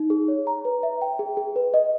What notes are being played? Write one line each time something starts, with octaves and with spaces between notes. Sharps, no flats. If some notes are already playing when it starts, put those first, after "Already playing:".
Already playing: D#4
G#4
C#5
A#5
B4
E5
G5
G#4
G#4
B4
D#5